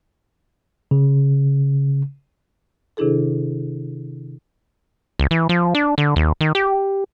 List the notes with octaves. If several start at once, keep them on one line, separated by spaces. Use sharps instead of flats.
C#3
C3 D#3 D4 E4 G#4 A4
C#2
E3
F3
D4
D3
D#2
D#3
G4